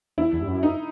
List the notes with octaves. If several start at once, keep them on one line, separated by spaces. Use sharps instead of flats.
E2 E4
E2
G2
F#2
D#4